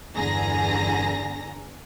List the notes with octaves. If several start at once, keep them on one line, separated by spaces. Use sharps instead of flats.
G1 E2 D3 G#4 A#5 A#6